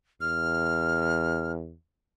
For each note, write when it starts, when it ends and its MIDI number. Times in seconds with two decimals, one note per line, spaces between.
0.21 1.74 40
0.21 1.52 89